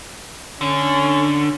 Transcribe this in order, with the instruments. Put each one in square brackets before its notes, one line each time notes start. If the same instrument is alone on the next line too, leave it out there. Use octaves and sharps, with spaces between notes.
[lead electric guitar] D3 [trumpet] C#4